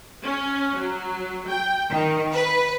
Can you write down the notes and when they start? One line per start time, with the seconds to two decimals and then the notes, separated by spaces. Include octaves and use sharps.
0.24 C#4
0.78 F#3
1.50 G5
1.92 D#3
2.34 B4